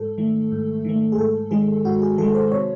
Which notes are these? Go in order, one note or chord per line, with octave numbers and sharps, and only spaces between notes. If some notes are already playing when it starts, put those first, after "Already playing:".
Already playing: G#2 A4
D#3 A3
G#2
D#3 A3
G#4
G#2 A4
D#3 G#3 G#4
G#2 F#4
G#4
D#3 G#3 A4
C5
C3 C#5